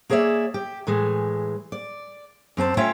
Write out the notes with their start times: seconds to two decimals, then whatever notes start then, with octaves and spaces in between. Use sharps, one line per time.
0.10 A#3 G#4 C#5 D5 E5
0.54 G4
0.87 A2 E3 G#3
1.72 D5
2.57 F#2 C4 G#5 A5
2.77 A3 C#4 F4 C#5 E5 G5